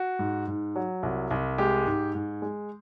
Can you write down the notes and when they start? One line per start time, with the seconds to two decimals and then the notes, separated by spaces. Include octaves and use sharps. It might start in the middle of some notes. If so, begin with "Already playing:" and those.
Already playing: F#4
0.19 G#2
0.47 G#2
0.76 F#3
1.03 C2
1.31 C2
1.58 G#3 G4
1.86 G#2
2.15 G#2
2.42 G#3